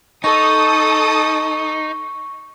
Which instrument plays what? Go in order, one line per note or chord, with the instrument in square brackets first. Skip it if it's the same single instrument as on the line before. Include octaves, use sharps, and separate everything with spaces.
[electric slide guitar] D#4 [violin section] A4 D#6 [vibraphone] C#6